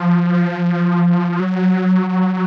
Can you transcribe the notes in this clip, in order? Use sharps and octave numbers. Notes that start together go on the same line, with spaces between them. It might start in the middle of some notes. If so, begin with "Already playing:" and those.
Already playing: F3
F#3